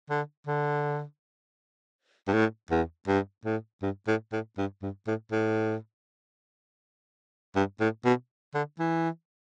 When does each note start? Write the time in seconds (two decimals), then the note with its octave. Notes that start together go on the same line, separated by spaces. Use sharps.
0.10 D3
0.47 D3
2.28 G2
2.33 A2
2.71 E2
3.08 G2
3.45 A2
3.82 G2
4.08 A2
4.32 A2
4.58 G2
4.83 G2
5.07 A2
5.31 A2
7.56 G2
7.80 A2
8.05 B2
8.55 D3
8.80 E3